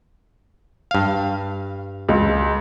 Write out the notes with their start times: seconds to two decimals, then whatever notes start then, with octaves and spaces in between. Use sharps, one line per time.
0.91 G2 F5
2.09 C#2